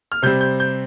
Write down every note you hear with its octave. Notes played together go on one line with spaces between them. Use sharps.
F6
C3 G3 C4 G6
G6
G6